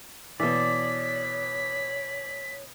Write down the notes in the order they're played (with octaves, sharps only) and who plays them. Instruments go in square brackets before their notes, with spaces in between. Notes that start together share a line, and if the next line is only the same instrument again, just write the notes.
[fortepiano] B2 E3 [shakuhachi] C#5 [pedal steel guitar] D5 [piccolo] B6